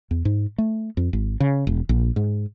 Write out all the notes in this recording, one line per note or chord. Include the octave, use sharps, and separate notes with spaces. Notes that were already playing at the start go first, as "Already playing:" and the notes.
E2
G#2
A3
F2
G#1
C#3
E1
A#1
G#2